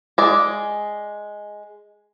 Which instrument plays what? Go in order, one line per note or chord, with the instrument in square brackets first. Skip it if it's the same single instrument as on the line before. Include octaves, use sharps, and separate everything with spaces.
[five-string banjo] G#3 D5